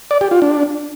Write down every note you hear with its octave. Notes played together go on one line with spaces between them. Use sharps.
D5
G4
F4
D4